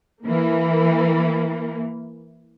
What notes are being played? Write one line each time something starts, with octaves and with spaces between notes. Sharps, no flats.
E3 A#3